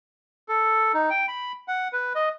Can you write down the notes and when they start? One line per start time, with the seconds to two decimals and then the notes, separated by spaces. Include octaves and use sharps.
0.49 A4
0.94 D#4
1.10 G5
1.28 B5
1.68 F#5
1.93 B4
2.15 D#5